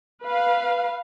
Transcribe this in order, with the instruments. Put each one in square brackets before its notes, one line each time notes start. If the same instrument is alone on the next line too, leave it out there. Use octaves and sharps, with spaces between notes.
[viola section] B4 F5